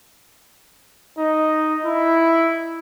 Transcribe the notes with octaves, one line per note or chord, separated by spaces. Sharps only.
D#4
E4